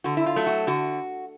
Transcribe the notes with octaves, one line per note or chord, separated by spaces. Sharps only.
D3 F#4
E4
F4
F#3 A3
F#4
D3 F#4